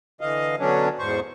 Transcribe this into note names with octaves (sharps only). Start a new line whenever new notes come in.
D3 E3 D#5 F5
B2 D3 F#3 C#4 D4
E2 G#2 C5 C#6